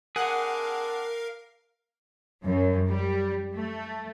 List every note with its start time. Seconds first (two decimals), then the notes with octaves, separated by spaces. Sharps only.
0.16 C4 D4 G#4 A#4 F5 F#5
2.44 F#2
2.89 G3
3.55 A3